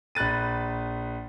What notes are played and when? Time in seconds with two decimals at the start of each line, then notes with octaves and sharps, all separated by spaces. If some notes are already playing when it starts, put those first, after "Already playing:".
0.15 A#1 B5 F#6 A6 D#7